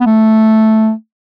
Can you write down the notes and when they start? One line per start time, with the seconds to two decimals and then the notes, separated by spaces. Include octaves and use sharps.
0.01 B3
0.06 A3